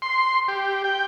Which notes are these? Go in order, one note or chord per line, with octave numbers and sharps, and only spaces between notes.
C6
G4
G5